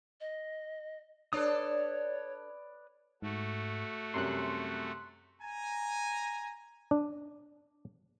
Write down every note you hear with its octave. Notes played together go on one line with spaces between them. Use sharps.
D#5
D4 A4 B4 C#5 D5 D#6
G#2 A3 F#4
F#2 C3 G3 C6 F#6
G#5 A#5
D4